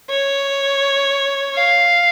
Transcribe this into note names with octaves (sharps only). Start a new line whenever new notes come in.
C#5
F5